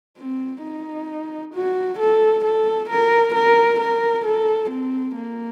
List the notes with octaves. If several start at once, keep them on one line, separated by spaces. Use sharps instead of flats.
C4
D#4
F#4
A4
A4
A#4
A#4
A#4
A4
C4
A#3